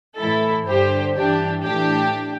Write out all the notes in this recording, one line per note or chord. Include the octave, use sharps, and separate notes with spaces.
A2 E3 E4 A4
G2 D3 G4 C5
G2 E3 D4 G4
A2 E3 D4 G4